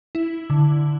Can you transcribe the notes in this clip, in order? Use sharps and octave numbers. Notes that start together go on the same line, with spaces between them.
E4
D3